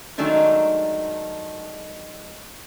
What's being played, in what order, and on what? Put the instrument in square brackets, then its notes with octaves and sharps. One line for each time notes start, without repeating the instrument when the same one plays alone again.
[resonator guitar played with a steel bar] D#3 F#3 G#3 A3 D4 D#4